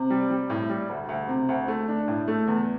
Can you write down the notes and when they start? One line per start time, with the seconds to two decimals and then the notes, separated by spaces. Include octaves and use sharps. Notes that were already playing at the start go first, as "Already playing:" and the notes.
Already playing: C3
0.10 G3
0.30 G3
0.50 A2
0.69 G3
0.89 D2
1.09 D2
1.29 C3
1.49 D2
1.68 A3
1.88 D4
2.08 A2
2.28 A3
2.47 E2